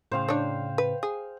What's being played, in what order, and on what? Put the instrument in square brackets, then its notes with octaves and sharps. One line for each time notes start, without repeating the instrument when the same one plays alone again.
[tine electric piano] A2 C#3 [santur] C5 F5 G5
[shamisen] D4 C#5
B4
G#4